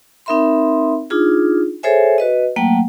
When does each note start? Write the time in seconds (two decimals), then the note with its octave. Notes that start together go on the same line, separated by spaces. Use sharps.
0.26 C4 D#4 A#4 E5 B5 C6
1.10 D4 D#4 F4 G#4
1.83 G#4 A4 C5 C#5 E5 G#5
2.18 F#4 B4 D#5
2.56 F#3 A3 A#3 F#5 G5